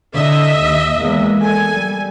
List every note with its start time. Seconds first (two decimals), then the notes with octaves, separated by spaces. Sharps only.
0.15 D3 D#5 E5
0.60 D#2
0.98 E2 G#3 A#3
1.41 A4 G#5
1.75 G3